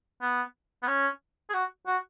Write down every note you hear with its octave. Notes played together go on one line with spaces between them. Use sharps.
B3
B3
C#4
G#4
F#4
F#4